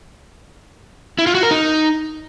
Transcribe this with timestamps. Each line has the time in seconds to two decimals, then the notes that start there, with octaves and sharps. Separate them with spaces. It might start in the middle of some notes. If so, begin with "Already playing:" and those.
1.19 E4
1.27 F4
1.35 F#4
1.43 A#4
1.51 D#4